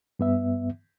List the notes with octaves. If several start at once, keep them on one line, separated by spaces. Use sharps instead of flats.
G2 B3 E5